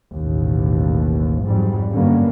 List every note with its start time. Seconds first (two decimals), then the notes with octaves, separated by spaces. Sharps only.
0.16 A1 D#2 B2
1.46 F2 G#2 F#3 G3
1.91 G2 D3 G3 A#3 B3 C#4